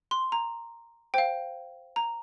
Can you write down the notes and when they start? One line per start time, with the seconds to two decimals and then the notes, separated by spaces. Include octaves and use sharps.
0.11 C6
0.32 A#5
1.14 C5 F5 G5
1.96 A#5